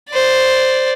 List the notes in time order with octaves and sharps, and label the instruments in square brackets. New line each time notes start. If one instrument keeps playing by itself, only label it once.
[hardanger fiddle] C5 D5